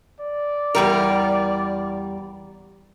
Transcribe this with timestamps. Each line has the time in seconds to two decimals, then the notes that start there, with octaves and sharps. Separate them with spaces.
0.20 D5
0.75 E2 G3 A#4